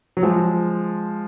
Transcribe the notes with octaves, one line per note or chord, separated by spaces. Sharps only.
F#3
F3 G#3